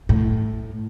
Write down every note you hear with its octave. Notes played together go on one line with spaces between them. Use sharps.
A2